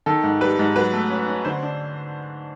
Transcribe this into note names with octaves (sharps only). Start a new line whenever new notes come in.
D#3 A4
G#2
G3 B4
G#2
F#3 B4
A3
C#4
C#4
D3 C5
D4